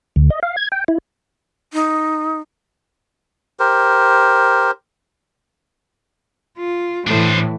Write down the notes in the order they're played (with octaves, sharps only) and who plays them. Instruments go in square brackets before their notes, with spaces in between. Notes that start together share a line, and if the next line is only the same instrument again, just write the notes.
[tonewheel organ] D2
D#5
F5
G#6
G5
E4
[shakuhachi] D#4
[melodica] G4 A#4 C5
[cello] F4
[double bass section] A2 [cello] E3 [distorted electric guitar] D4 C5